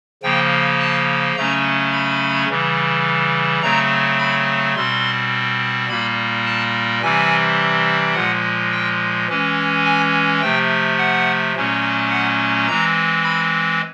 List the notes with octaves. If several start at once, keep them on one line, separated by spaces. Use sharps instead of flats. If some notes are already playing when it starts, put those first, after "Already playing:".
C#3 F3 A#3 G5
A5
C#3 F#3 A3 C#4 A#5
B5
C#3 E3 G3
C#3 F#3 A3 C4 A#5
B5
B2 G3 C4 C6
A#2 G3 A#3 B5
A5
C3 E3 G3 C4 G#5
A#2 F3 G#3 F#5
G5
E3 G#3 C#4
G#5
C3 F3 A3 G5
F#5
A#2 F#3 A3 C#4
F#5
E3 G#3 C4 A#5
B5